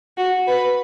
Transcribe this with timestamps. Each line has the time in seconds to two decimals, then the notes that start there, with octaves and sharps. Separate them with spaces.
0.17 F#4
0.47 B4